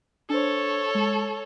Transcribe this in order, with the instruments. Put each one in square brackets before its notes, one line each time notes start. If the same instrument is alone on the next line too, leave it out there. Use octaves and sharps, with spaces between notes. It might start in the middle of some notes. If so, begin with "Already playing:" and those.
[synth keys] D4 C5 [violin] A4 C#5
[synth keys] G#3